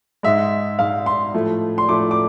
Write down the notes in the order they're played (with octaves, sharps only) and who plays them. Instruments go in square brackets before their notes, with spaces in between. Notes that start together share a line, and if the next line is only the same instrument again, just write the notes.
[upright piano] G#2 G#3 E5
G#2 G#3 F5
C6
A2 F3 A3
C6
A2 F3 A3 D6
D6